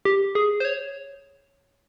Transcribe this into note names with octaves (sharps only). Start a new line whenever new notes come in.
G4
G#4
C5
C#5